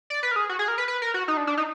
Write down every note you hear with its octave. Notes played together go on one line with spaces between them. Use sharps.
D5
B4
A#4
G#4
F#4
G#4
A#4
B4
B4
A#4
F#4
D#4
D4
D4
D#4